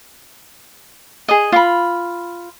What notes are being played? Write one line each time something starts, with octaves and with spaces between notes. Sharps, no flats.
G#4 D#5
F4 B5